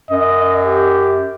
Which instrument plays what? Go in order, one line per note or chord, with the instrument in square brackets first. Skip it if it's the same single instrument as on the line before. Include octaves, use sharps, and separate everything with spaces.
[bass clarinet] F#2 [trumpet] D#5
[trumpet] G4